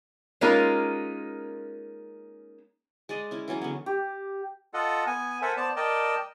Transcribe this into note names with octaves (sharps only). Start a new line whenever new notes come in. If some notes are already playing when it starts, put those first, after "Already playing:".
G#3 A#3 C#4 D#4 F4 A#4
G#3 D5 D#5
C#4 E4
E3 F#3 C#4 G#4
D3 B3
G4
F4 A4 D#5 F#5
B3 G#5
A4 A#4 C5 E5 F#5 G#5
B3 C5 D5 A5
A#4 D5 D#5 G5 A5